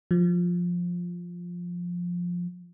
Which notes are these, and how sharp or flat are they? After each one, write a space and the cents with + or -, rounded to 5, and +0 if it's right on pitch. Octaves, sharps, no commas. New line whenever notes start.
F3 +10